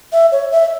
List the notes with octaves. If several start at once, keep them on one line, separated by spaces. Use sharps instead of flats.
E5
C#5
E5